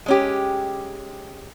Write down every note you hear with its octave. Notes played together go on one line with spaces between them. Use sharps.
G#3 C#4 G4